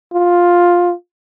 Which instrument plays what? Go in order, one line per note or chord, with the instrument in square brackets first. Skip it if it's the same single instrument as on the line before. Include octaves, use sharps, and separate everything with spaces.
[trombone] F4